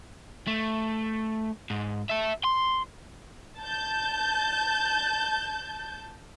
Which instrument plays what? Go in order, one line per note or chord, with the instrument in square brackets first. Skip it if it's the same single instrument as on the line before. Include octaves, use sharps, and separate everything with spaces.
[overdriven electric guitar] A3
G#2
E5 A5
C6
[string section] A5 G6